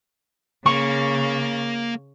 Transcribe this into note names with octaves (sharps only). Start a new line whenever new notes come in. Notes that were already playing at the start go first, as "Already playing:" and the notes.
C#3 A#3 C#6